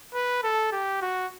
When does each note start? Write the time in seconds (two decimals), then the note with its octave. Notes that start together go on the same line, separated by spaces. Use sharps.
0.14 B4
0.43 A4
0.72 G4
1.02 F#4